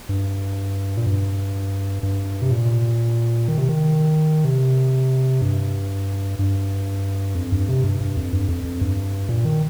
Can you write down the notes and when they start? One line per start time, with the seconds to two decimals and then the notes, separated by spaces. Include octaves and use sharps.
0.09 G2
0.97 A#2
1.07 G2
2.03 G2
2.42 C3
2.51 A#2
3.48 D#3
3.58 C3
3.69 D#3
4.45 C3
5.41 G2
6.39 G2
7.35 F2
7.52 G2
7.68 C3
7.84 G2
8.00 G2
8.17 F2
8.33 G2
8.49 F2
8.65 F2
8.81 G2
9.29 A#2
9.45 D#3